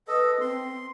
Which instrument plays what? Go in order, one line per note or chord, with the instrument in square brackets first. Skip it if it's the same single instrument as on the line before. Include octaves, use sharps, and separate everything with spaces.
[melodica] A4 D#5 [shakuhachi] B4
[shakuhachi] C4 [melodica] C6